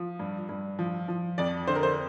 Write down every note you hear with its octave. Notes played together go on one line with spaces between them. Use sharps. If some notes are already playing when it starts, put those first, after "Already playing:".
Already playing: F3
G2
G2
F3
F3
F2 D5
D3 C5
A#4
C5